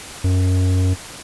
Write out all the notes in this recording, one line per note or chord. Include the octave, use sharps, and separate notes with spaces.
F#2